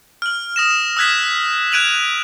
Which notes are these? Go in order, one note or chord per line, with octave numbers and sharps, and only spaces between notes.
F6 F#7
D#6 A#6 E7
D#6 E6 F#6 G#6 B6 E7
F#6 G#6 D7 D#7 F7 F#7